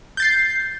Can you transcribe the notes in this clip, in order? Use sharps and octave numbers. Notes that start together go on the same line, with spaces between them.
G6 A6 C7